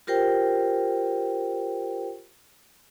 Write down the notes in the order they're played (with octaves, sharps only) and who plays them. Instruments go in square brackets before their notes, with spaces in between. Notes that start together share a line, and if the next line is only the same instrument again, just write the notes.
[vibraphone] F4 G4 A#4 C5 G5